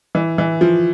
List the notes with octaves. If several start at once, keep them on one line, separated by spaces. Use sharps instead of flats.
E3
E3
F3